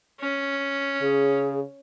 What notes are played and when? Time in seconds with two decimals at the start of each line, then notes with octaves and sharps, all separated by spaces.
0.20 C#4
1.01 C#3 G#4